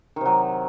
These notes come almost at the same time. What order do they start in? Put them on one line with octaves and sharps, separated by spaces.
D#3 C3 F#3